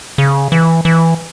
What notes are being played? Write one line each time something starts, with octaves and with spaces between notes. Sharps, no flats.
C#3
E3
E3